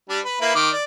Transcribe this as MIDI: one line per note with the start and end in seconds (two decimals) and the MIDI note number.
0.09 0.19 55
0.09 0.19 62
0.25 0.38 71
0.41 0.52 58
0.41 0.52 64
0.41 0.52 71
0.55 0.70 51
0.55 0.70 86
0.72 0.84 74